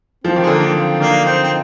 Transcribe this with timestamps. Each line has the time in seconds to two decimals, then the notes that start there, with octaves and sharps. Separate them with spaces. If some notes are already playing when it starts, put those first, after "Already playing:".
0.24 F3 C4
0.36 D#3
0.43 G#3
0.47 D3 A#3
0.60 D#3
0.75 C4
1.00 D#3 A#3 D4
1.25 C4 D#4
1.43 C4